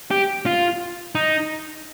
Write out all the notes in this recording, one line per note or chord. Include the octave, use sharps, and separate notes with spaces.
G4
F4
D#4